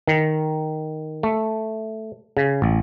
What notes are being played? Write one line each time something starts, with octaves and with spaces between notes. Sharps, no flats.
D#3
A3
C#3
A1